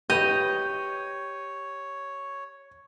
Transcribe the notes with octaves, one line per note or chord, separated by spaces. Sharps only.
G4 B4 C#5 D#5 G6